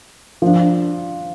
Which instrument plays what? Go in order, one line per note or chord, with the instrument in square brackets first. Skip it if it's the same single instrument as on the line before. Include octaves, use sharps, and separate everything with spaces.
[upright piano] F3 D4